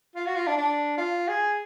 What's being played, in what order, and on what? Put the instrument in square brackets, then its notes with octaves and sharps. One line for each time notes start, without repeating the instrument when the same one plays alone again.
[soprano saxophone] F4
F#4
F4
D4
D4
F4
G#4